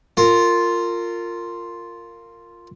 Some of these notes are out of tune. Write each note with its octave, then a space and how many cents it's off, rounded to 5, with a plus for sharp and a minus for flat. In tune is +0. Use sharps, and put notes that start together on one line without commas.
F4 +0 A#4 -25